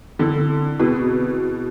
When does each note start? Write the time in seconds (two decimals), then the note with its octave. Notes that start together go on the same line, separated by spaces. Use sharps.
0.19 D3 C4 E4 A4
0.79 B2 C4 E4 G#4 B4